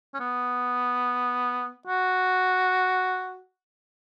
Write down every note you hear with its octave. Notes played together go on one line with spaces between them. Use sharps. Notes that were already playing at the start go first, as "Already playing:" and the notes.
C#4
B3
F#4